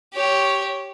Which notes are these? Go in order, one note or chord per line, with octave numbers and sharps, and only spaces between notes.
G4 C#5